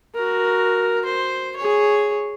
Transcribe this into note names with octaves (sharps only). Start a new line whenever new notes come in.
F#4 A#4
C5
G#4 C#5